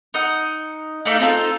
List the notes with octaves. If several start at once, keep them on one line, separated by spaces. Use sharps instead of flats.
D#4 D#5 F#5
A3 D#4 D5 F5
C4 D#4 F4 A4